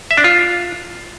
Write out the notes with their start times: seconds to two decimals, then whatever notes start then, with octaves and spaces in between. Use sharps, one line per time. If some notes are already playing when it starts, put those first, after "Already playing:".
0.11 E5
0.17 D4
0.24 F4